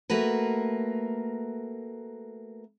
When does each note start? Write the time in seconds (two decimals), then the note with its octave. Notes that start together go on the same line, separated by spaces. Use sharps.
0.10 A3 A#3 F#4 A#4 B4